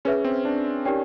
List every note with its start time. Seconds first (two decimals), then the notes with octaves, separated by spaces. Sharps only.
0.05 C#4 G#4 B4 E5
0.24 C4
0.45 D4
0.85 C#4 D#4 G4 A#4 D5 G5